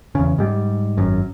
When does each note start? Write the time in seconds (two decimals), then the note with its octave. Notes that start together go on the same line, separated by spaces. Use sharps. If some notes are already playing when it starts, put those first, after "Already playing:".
0.15 E2 C#3
0.38 G#2 G3
0.97 G#1 F#2